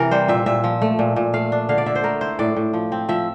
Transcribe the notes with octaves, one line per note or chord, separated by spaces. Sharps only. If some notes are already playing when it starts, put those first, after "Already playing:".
Already playing: C3 E3 A#4
G3 C5
A#2 E5
A#2 E5
F3
A3
A#2
A#2
A3 F5
D4
D3 F5
D5
D3 E5
C5
A3 A#4
E4 C5
A2 D5
A2
F3
C4
F3 E5